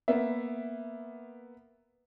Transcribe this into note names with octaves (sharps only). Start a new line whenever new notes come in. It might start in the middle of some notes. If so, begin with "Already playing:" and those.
A#3 B3 E5